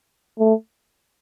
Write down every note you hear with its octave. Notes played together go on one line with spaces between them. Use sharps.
A3